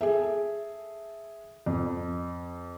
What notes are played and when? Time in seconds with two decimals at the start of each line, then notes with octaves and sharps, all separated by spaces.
0.01 G#4 A4 E5
1.66 F2